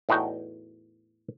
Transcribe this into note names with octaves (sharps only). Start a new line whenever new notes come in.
E2 A2 D#4 F#4 G5